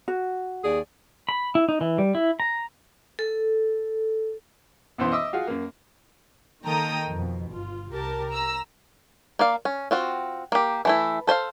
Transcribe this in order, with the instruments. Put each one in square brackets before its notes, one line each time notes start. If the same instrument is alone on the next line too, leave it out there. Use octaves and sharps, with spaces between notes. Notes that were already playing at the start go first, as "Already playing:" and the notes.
[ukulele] F#4
[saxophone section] D#2 G#4 D5
[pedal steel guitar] B5
E4
D#4
E3
G3
E4
A#5
[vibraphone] A4
[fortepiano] B1 F#2 E3 B3 C5 C6
D#5 E5 D6 E6
F4 F#4 G#4
F#2 A#3
[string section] D#3 A#3 A4 G5 A#5 D#6
F2 B2
G1 F4
C2 G4 A#4 A5
A#5 E6
[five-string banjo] A#3 D5 F5
C#4
C4 F4 F#4
A#3 G4
E3 A3 E4
A4 C5 E5 F5